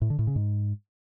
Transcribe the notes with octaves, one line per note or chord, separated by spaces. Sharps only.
A2
D3
A2
C#3
G#2